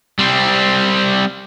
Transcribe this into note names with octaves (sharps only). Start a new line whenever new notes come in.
G3 C4